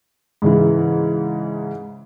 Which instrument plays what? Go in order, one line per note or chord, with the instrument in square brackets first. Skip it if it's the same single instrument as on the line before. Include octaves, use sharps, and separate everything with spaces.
[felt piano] G#2 C#3 E3